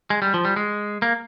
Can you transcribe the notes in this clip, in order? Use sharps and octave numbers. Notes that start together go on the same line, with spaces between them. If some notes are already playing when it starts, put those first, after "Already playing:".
G#3
G3
F3
G3
G#3
A#3